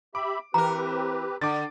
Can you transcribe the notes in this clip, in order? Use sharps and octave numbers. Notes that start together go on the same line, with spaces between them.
G4 E5 B5 D6
E3 C4 G4 A#4 B4 A#5
D3 D6 A6